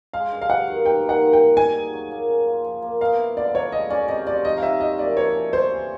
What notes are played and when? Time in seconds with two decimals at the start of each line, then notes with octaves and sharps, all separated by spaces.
0.13 G#3 F5
0.32 G2
0.42 F5
0.49 G2 F#5
0.67 D#3
0.85 A#3 G5
1.03 D#3
1.09 F#5
1.21 D#3
1.33 G5
1.39 G3
1.57 D#4 G#5
1.75 G#4
1.93 F#3
2.11 A#3
2.30 C#4
2.47 F4
2.64 F3
2.82 A#3
3.01 B3 F5
3.19 E4
3.37 D3 D5
3.55 F#3 C#5
3.72 G#3 D#5
3.90 C#4 D5
4.08 C3 D#5
4.26 F3 D5
4.45 D#4 D#5
4.58 F5
4.62 G4 E5
4.80 F3 D#5
4.98 A#3 D5
5.16 A3 C#5
5.35 C#4
5.53 G2 C5
5.71 E3